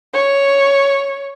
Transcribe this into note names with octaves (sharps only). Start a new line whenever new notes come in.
C#5